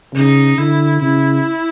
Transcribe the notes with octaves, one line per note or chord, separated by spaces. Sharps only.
C#3 D#4
D3 E4
C#3 E4